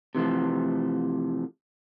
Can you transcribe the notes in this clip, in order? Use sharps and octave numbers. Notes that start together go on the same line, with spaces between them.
C3 E3 F3 A3